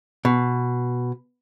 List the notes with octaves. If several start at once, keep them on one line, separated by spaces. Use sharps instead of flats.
B2